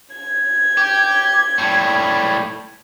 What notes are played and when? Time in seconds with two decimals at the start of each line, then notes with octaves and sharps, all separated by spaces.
0.15 G#6
0.77 G4
1.58 A2 G3